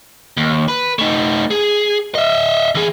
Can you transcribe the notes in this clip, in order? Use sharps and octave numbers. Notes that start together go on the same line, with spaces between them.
D#2
B4
A3 D#4
G#4
D#5 E5
E3 G#4